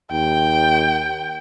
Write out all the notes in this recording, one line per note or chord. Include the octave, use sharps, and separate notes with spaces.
D#2 G5